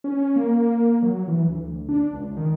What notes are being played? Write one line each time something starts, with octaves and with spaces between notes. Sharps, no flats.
C#4
A#3
F#3
E3
D2
D4
C#2
D#3